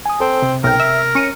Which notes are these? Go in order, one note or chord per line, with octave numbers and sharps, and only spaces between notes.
G#5 D#6
C4 A4 C5
C3
B1 A#4 G5
E5
C#4 C#7 D#7